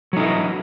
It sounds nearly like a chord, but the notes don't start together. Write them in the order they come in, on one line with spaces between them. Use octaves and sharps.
F#3 D#4 E4